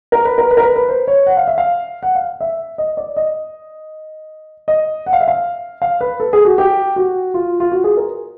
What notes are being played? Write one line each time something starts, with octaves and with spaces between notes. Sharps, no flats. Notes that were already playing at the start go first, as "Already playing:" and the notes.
A#4
B4
A#4
B4
A#4
B4
B4
C5
C#5
F#5
F5
E5
F5
F#5
F5
E5
D#5
D5
D#5
D#5
F#5
F5
E5
F5
F5
B4
A4
G#4
F#4
G4
F#4
F4
F4
F#4
G#4
A#4